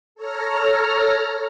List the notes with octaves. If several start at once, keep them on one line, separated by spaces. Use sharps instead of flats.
A4 C#5 A#5 F6